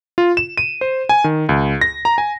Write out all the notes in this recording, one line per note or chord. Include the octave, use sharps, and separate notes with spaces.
F4
E7
D#7
C5
G#5
D#3
C#2
A#6
A#5
G#5